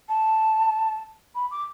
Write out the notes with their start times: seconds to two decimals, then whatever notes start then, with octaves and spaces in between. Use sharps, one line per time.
0.09 A5
1.35 B5
1.51 D6